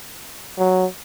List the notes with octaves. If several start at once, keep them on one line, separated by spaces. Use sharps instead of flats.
F#3